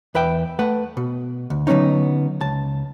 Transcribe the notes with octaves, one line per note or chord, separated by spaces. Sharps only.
E2 B4 E5 G5
A3 B4 F#5
B2
D2
D3 F#3 A3 B3 C#4 D#4
C#2 A5